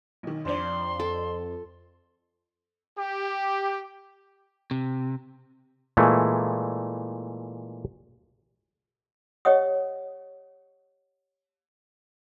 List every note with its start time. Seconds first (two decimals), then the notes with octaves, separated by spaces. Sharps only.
0.23 B1 D#3
0.45 F2 D4 C5 D5 C6
1.00 A4
2.99 G4
4.71 C3
5.97 A#2 E3 G#3 A3
9.45 G4 C#5 D#5 F#5 D#6